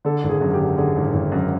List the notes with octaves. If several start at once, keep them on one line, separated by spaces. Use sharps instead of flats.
D3 A4
G#1
G#4
F#2
G4
D3
D3 G#4
G#1
G#1
F#2